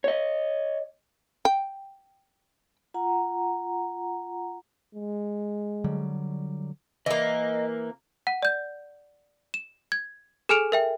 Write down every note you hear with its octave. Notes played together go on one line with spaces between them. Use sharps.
C#5 D#5
G5
F4 F#5 A#5
G#3
D3 F#3 G3
E3 A#3 D#5
F#5 D#7
D5 G6
E7
G#6
G#4 A4 G#5 F6 D7 F7
A#4 E5 G5